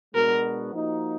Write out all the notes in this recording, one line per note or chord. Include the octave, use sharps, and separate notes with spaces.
B2 G#3 B3 D4 F#4 A#4
F3 A#3 D#4 F#4